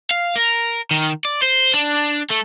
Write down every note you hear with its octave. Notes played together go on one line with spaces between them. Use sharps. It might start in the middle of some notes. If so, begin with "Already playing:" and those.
F5
A#4
D#3
D5
C5
D4
A3